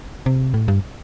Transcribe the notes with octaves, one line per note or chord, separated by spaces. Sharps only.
C3
A2
G2